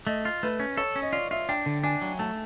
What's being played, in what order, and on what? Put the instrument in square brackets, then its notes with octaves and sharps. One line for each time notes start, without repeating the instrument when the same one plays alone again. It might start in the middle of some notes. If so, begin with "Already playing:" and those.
[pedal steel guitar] A3 [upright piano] D#5
[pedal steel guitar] F4
[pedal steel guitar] A3 [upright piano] B4
[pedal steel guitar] C#4
[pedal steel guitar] A4 [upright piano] C#5
[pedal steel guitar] C#4
[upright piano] D#5
[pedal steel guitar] F4 [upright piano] D5
[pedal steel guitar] F4 [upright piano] E5
[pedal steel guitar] D4 [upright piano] G5
[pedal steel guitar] D3
[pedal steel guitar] D4 [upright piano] G#5
[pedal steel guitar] F#3
[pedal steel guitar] A3 [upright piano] A5